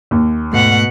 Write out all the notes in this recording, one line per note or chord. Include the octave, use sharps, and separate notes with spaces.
D#2
G#2 B2 A3 F#5